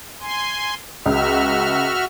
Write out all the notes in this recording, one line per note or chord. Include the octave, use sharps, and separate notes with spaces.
G#5 C6
C#2 F#4 E5 F6